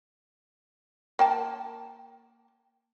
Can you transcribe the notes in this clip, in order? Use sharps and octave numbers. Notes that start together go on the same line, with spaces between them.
A#3 G5 A5